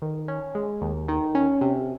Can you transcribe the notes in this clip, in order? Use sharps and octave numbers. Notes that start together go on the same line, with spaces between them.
D#3
C#4
G#3
D#2
D#3
C#4
C3